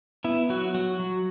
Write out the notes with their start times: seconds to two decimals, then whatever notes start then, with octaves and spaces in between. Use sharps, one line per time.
0.24 B3 E4
0.49 F#3 F#4
0.74 F#3 F#4
1.00 F#3